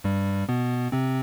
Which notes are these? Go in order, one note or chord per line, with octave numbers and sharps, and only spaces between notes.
G2 G3
B2 B3
C3 C4